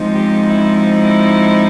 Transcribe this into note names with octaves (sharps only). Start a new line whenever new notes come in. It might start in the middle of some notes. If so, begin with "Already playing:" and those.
Already playing: F3 G#3 C4 D#4
G4
E4
E4